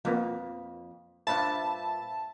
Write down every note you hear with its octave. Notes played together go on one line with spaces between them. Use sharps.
F2 F3 A#3 B3
G2 A#2 C5 E5 A5 B5